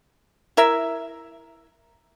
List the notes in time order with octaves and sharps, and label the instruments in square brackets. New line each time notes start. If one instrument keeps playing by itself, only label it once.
[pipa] E4 A#4 E5